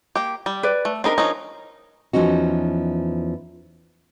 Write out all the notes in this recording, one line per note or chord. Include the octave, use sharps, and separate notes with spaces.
A#3 G4
G3
B4 D5
A3
C4 D4 D#4 A#4 B5
F3 C#4 D#4
E2 F3 C#4 D#4 F#4